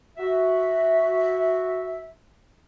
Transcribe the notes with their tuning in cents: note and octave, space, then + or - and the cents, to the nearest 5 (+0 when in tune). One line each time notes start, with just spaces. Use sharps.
F#4 +0 E5 -10